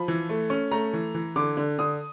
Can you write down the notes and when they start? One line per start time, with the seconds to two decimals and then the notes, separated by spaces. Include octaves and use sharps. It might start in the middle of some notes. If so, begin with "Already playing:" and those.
Already playing: F3 B5
0.08 E3
0.29 A3
0.50 C#4
0.71 A3 A#5
0.93 E3
1.14 E3
1.36 D3 D6
1.57 D3
1.79 D3 D#6